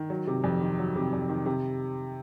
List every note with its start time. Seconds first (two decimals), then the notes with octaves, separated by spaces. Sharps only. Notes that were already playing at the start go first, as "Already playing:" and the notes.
Already playing: D#3
0.10 F#3
0.27 C3
0.44 F2
0.61 D#3
0.79 F#3
0.96 C3
1.13 F2
1.29 D#3
1.46 C3